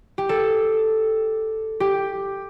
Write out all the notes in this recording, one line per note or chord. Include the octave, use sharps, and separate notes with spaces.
G4
A4
G4